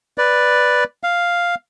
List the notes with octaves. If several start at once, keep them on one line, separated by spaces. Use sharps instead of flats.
B4 D5
F5